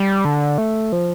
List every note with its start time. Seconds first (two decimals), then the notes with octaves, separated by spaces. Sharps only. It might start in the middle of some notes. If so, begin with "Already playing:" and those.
Already playing: G3
0.25 D3
0.58 A3
0.92 F3